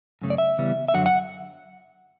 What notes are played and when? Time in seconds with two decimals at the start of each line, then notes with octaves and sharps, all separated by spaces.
0.21 F#2 C#3 A3
0.30 D5
0.38 E5
0.58 C#3 E3 G3 B3
0.88 E5
0.94 F#2 D3 F#3 F#5
1.06 F#5